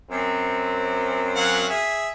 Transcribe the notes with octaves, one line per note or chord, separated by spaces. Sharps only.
F#2 C4
F#3 F5 F#5
G#4 E5